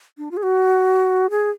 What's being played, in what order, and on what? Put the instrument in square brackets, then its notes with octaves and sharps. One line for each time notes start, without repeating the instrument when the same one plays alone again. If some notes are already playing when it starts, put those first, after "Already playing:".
[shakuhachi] D4
F4
G#4
F#4
G#4